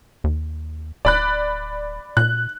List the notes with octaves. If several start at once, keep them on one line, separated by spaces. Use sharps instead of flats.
D#2
D1 D5 B5 F#6
A#2 F#6